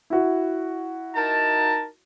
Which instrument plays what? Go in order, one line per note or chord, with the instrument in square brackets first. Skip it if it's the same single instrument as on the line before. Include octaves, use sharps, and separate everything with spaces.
[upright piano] E4 F#4
[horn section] D#4 A#4 A5